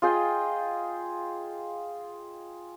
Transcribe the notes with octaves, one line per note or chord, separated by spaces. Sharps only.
F4 G#4 D#5 G5